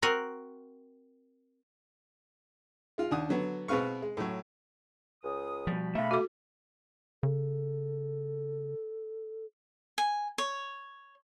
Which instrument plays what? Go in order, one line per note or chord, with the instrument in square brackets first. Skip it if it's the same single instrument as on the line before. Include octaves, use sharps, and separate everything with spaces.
[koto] C4 F#4 A#4
[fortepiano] G#3 F4
D#2 D4 F#5 D#6
D3 F#3 B3
B2 G#3 C4 B4 F5 C#6
G#3
A2 F#3
[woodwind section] C#2 D#6
[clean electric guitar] B2 G3 [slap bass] F3
[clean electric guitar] B2 E5 [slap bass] A3 [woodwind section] F5 B5
[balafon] F#4 A4 D6
[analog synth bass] C#3 [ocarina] A4
[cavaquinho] G#5
C#5